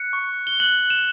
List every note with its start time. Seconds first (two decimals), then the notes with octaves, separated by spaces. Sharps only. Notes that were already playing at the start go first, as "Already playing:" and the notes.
Already playing: F#6 C#7
0.13 C#6
0.47 G7
0.60 F#6 F#7
0.90 E7